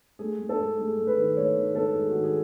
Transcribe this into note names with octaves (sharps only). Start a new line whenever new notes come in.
A3 G#4
A3
A4
G#2
A3 G#4
A3
B4
D#3
A3 C#5
D#3
G#2 A4
G#2 G#4
D#3 F#4
G#4